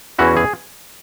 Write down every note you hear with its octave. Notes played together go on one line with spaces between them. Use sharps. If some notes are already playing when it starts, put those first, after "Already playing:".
E2 E3 C#4 E4 F#4
G#4